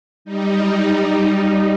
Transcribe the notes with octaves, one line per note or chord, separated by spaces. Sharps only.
G3 D#4